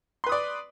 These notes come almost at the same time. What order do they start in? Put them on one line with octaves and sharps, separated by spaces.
C6 B4 D#6 D5